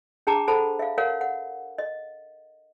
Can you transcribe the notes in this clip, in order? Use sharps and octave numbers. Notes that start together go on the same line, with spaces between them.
D4 G#4 G5 A5 A#5 D6
A4 C5 F#5 A5 B5
E5 F5
A#4 C#5 F5 F#5
F#5
D#5